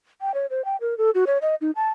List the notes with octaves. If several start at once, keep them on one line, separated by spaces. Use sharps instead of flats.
G5
C#5
C5
G5
A#4
A4
F#4
C#5
D#5
D#4
A5